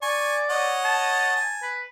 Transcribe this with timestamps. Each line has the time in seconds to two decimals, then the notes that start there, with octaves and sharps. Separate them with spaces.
0.02 D5 G#5 C#6
0.50 C#5 D#5 F#5
0.85 A5
1.36 G#5
1.63 B4